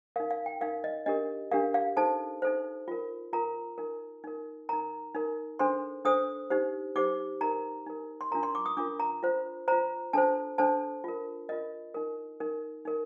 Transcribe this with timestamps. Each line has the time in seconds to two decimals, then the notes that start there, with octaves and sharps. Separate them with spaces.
0.16 D#4 A#4 F5
0.31 F5
0.46 G5
0.61 D#4 A#4 F5
0.84 D#5
1.06 D4 G4 A#4 D#5
1.51 D4 G4 A#4 F5
1.74 F5
1.97 D#4 A4 C5 A5
2.42 D#4 A4 C5
2.88 F4 A#4
3.33 F4 A#4 A#5
3.78 D#4 A#4
4.24 D#4 A#4
4.69 D#4 A#4 A#5
5.15 D#4 A#4
5.59 D4 A4 C5 C6
6.05 D4 A4 C5 D#6
6.50 D#4 G4 C5
6.96 D#4 G4 C5 D6
7.41 D#4 A#4 A#5
7.86 D#4 A#4
8.21 C6
8.31 D4 F4 A#4 A#5
8.43 C6
8.55 D6
8.66 D#6
8.77 D4 F4 A#4 D6
9.00 A#5
9.23 F4 C5
9.68 F4 C5 A#5
10.13 D4 A4 C5 A5
10.58 D4 A4 C5 A5
11.04 F4 A#4
11.49 F4 A#4 D#5
11.94 D#4 A#4
12.40 D#4 A#4
12.85 D#4 A#4